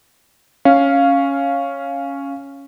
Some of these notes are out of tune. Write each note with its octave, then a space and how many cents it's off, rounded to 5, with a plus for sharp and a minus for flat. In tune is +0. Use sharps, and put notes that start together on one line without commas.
C#4 +0 F5 +0